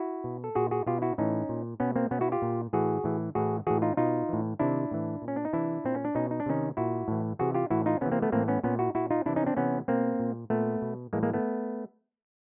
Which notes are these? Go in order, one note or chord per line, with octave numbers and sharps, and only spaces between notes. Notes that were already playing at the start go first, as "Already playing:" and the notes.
Already playing: E4 F#4
B2
A4
A#2 F#4 G#4
F#4 G#4
B2 F4 G4
E4 F#4
A2 E3 C#4 D#4
A#2
B2 B3 C#4
A#3 C4
B2 B3 C#4
E4 F#4
F4 G4
A#2
A2 E3 F#4 G#4
A2 E3
A2 E3 F#4 G#4
A2 E3 F#4 G#4
D#4 F4
B2 D#4 F4
A2 E3
C3 D#3 D4 E4
A2 E3
A#2
C#4
D4
D#4
C3 E3 D4 E4
A#2 C4
C#4
D4
B2 C#4 D#4
D#4
D4
C3 D#3 C#4 D#4
A#2 E4 F#4
A2 E3
C3 E3 F#4 G#4
F4 G4
A2 E3 E4 F#4
D#4 F4
C3 E3 B3 C#4
A#3 C4
A3 B3
A2 E3 A#3 C4
B3 C#4
A#2 B3 C#4
E4 F#4
A#2 E4 F#4
D#4 F4
C3 E3 D4 E4
C#4 D#4
C4 D4
C3 E3 B3 C#4
B2 A#3 C4
A#2
A#2 A3 B3
B2
A2 E3 G#3 A#3
G#3 A#3
A3 B3